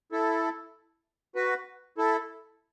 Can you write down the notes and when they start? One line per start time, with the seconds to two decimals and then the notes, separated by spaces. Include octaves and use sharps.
0.12 E4 A4
1.36 F#4 B4
1.98 E4 A4